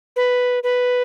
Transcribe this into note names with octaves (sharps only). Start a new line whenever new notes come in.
B4
B4